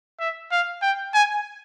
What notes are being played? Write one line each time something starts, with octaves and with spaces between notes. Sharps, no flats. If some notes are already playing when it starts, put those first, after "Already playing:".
E5
F5
G5
G#5